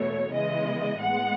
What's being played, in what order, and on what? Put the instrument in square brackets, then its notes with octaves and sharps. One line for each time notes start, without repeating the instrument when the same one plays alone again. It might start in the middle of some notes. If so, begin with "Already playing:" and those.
Already playing: [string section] E2 B2 A3 C#5
C#3 E3 G#3 B3 D#5
A2 G#3 B3 F#5